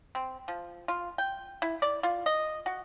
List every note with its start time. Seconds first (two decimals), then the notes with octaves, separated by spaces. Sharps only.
0.15 C4
0.48 F3
0.88 F4
1.18 G5
1.62 E4
1.82 D5
2.03 F4
2.26 D#5
2.66 F#4